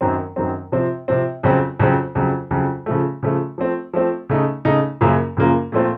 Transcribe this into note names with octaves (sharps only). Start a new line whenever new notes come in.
F#2 D#3 F#3 C4
F#2 D#3 F#3 C4
C3 F3 C4
C3 F3 C4
F2 C#3 F#3 C4
F2 C#3 F#3 C4
F2 C#3 F#3
F2 C#3 F#3
C#3 F3 A3
C#3 F3 A3
F3 A3 C4
F3 A3 C4
C#3 A3 D#4
C#3 A3 D#4
F#2 C#3 F3 A#3 F4
F#2 C#3 F3 A#3 F4
A#2 F3 A3 C4 F4